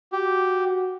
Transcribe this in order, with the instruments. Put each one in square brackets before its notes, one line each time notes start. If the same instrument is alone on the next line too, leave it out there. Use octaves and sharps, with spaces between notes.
[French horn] F#4 [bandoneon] G4